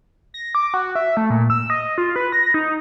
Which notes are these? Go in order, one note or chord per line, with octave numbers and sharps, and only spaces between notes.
A#6
D6
F#4
E5
A3
A#2
E6
D#5
F4
B4
A#6
D#4